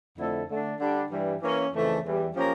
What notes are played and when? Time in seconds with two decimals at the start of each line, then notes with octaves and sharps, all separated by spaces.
0.18 F2 D3 A3 E4 A4
0.48 D3 A3 D4
0.80 D3 G3 D4
1.11 G2 E3 G3
1.41 E3 A#3 C#4
1.73 F2 C#3 E3 A3
2.04 E2 E3 G3
2.35 F3 A#3 C#4 G4 A#4